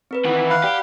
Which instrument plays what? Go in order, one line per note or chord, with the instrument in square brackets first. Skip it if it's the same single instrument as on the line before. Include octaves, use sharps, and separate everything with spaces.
[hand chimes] C4 A#4 B4
[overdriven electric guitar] D#3 E3 [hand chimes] F#5
[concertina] F5 F#5 [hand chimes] B5 F#6
[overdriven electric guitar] G4 [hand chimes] D5